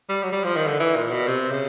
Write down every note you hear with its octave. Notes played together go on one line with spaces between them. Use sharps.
G3
F#3
G3
F3
D#3
D3
E3
A#2
B2
C3
C#3